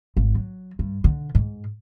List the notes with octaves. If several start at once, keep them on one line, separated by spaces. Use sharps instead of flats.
G#1
F#3
G2
D3
G#2